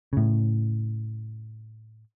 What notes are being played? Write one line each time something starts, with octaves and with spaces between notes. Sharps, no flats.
A2 C#3